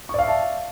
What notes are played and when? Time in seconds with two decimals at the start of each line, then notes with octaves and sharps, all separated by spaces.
0.09 C#6
0.14 D5
0.19 F5
0.23 E5
0.28 A5